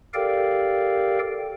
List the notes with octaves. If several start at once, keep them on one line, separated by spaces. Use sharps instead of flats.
G4 A4 A#4 D5 F5 G5